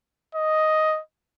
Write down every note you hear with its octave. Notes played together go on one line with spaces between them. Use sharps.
D#5